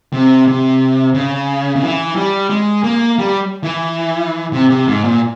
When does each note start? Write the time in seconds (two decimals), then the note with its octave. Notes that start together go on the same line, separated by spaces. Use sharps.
0.13 C3
0.48 C3
1.14 C#3
1.76 C#3
1.83 E3
2.16 G3
2.50 G#3
2.83 A#3
3.19 G3
3.64 E3
4.53 C3
4.70 C3
4.88 G#2
5.04 A#2